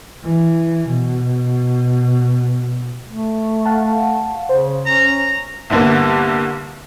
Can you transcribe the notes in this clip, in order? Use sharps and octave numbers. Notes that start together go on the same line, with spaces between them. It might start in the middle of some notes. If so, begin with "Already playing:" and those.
E3
B2
A3
F5 F#5 A5
C#3 C5
C#4 A#5
C2 G2 D3 A#3 B3